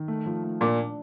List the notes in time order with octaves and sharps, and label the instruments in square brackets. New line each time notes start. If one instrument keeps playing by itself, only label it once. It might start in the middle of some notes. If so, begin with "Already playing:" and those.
Already playing: [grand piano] D#3
A3
F3
A3
[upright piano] A#2 [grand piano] D4